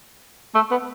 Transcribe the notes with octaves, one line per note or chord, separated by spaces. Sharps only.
A3
B3